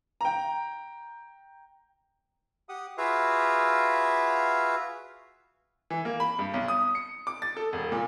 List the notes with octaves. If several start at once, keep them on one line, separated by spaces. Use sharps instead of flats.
G5 A#5
G4 F#5 D#6
F4 F#4 G#4 B4 E5 F5
E3
A#3
B5
G2
B1
D#6
C#7
D6
A6
A4
E1
A#2